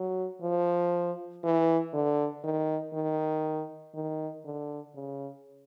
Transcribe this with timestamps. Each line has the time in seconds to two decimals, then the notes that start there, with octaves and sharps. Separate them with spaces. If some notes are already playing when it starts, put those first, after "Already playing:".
Already playing: F#3
0.42 F3
1.43 E3
1.94 D3
2.44 D#3
2.94 D#3
3.95 D#3
4.45 D3
4.94 C#3